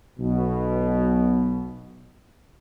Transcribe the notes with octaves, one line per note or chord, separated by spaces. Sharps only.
B1 B2